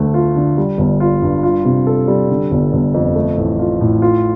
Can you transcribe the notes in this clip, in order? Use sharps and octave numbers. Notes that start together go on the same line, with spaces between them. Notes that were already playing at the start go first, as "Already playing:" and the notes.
Already playing: D2 A3
F4
D3
G3
G1
F4
G2
F4
C3
A4
G3
D3
G1
G1
F2
A3
A1
F4
A2
F4